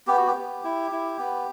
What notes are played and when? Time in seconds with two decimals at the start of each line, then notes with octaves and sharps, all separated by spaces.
0.07 B3 G4
0.18 F#4
0.27 G4
0.35 B3
0.64 E4
0.91 E4
1.19 B3